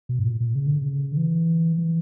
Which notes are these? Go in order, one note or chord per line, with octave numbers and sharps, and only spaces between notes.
B2
G2
A#2
A#2
C#3
D3
C#3
D3
E3
E3